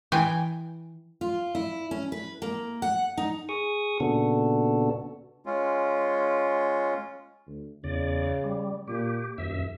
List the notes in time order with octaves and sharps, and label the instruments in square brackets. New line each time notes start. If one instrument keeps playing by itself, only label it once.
[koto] E3 G5 G#5
[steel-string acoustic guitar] F4
E4
C#4
B4
A#3
F#5
D#4
[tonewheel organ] G#4 C#6 D#6
A#2 C#3 B3 D4 F#4 A4
[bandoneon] G#3 C#4 F4
[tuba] D2
[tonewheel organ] E2 D5 [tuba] C#3
[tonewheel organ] G3
[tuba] A#2 [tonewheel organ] G4
[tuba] D#1 [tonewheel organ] F#2 E5